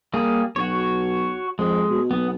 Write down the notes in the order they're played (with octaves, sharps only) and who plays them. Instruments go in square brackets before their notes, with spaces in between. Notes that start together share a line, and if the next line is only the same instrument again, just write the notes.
[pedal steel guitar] G3 A#3 G#4
[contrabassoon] B1 [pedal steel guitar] F#4 C#5
[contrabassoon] F2 [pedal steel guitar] G#3
[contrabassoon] B2
[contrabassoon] B1 [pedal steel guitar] B3